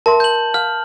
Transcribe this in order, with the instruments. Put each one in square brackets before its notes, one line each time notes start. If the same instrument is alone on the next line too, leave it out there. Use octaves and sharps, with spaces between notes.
[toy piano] A#4 E5 C6 [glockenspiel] A5
[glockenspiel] G6 F#7
[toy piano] F5 [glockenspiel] F6